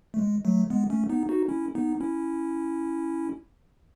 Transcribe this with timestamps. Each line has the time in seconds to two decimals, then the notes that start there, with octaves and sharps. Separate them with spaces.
0.14 A3
0.18 G#3
0.45 F#3 A3
0.70 G#3 B3
0.90 A3 C#4
1.09 B3 D#4
1.29 D#4 F#4
1.48 C#4 E4
1.75 B3 D#4
2.00 C#4 E4